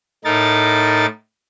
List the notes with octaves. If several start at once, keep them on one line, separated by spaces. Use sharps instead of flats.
A2 D#4 A#4 A6